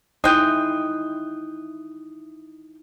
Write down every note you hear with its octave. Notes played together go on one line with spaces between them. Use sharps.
G#3 D#4 E4 G5 D#6 F#6 D#7